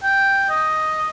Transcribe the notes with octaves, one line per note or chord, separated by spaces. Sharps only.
G5
D#5